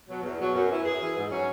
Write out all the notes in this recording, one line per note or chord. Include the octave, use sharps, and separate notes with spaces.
B2 F#3
E2
B2 F#3
F#2
E3
F#2 G#4
E3
G#2
F#3 C#4